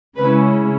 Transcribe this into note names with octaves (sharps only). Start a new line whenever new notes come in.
C#3 G#3 C#4 E4 B4